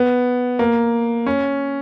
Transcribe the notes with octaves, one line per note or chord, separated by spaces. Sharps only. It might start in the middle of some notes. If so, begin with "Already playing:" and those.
Already playing: B3
A#3
C#4